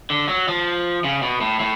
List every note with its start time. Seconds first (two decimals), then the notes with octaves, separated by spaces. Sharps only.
0.10 D3
0.29 F#3
0.48 F3
1.04 C#3
1.22 B2
1.41 A2
1.60 A2